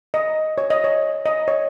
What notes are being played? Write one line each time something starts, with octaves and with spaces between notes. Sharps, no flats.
D#5
C#5
D#5
C#5
D#5
C#5